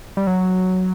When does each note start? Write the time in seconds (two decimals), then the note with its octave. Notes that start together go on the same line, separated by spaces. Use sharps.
0.17 G3
0.27 F#3